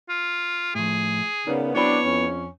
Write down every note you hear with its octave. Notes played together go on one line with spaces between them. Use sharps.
F4
A2 F3 G#4
C#3 B3 D#4 A#4 D5
F#3 B3 C4 D4 E4 C#5 B5
F2 C#4